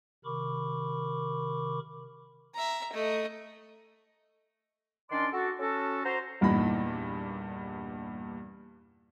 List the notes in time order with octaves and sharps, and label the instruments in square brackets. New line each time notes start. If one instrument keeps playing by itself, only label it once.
[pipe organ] C3 D#3 A#4 B5 C#6 D6
[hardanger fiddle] E5 A#5
A3 D#5
[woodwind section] D#3 C#4 D4 D5 C6
F#4 A4
C#4 F#4 A4
F#4 C5 A#5
[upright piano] E2 G2 A#2 D#4 B5 A#6